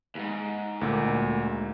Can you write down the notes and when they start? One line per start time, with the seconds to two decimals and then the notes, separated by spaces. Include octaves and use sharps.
0.15 D#2 G#2
0.81 D2 A#2